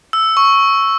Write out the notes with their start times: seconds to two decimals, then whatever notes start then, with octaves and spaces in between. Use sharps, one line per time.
0.13 E6
0.37 C#6